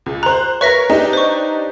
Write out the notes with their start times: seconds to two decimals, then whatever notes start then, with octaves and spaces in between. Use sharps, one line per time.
0.06 C#2
0.23 C5 A#5 F#6
0.61 A#4 B4 C#5 E5 A#6
0.90 D4 D#4 G4
1.13 C5 C#6